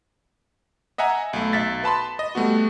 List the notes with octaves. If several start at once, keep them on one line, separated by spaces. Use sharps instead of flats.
D#5 E5 F#5 G#5 A#5
B1 A3
B1 E5 A6 B6
B4 A5 B5 C6
D#5
G3 A3 B3 F#4